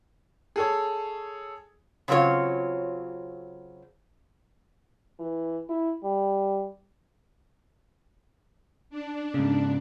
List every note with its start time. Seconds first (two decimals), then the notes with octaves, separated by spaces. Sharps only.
0.56 G#4 A4 C#5
2.08 C#3 F#3 C4 F4 C#5
5.19 E3
5.69 E4
6.04 G3
8.90 D4
9.34 G#2 C#3